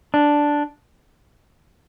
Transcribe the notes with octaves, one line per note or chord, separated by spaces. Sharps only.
D4